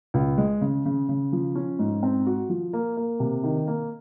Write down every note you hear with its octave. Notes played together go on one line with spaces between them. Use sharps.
C#2
G#3
C#3
C#3
C#3
F3
C#4
G#2
C4
F#4
F3
A#3
A#3
C3
D#3
A#3